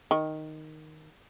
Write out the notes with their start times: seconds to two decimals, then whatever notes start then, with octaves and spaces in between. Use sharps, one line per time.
0.11 D#3